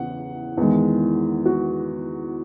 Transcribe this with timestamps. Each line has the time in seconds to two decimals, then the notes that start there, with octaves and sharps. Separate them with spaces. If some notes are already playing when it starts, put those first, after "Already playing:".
Already playing: E2 C#3 F#5
0.57 E2 D#3 G#3
1.46 F#4